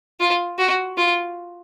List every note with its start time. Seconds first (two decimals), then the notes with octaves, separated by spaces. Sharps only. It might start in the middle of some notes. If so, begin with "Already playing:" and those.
0.20 F4
0.59 F#4
0.97 F4